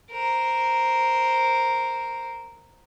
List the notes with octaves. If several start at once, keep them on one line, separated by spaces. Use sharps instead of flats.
A#4 C5